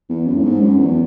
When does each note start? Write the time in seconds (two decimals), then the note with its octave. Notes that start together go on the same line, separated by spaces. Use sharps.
0.09 E2
0.26 F#2
0.37 A2
0.43 G#2
0.60 F#2
0.77 E2